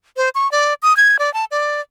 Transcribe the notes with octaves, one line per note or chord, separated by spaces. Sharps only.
C5
C#6
D5
D#6
G#6
D5
A5
D5